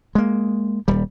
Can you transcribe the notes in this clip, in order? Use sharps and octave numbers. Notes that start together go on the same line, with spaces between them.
G#3 A#3
D#1 G3